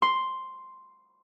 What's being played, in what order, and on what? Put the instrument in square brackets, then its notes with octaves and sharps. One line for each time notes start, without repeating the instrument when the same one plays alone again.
[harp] C6